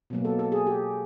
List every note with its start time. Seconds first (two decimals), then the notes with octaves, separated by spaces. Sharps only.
0.10 B2 F#3 A#3
0.25 A4
0.39 A4
0.52 G#4
0.67 G4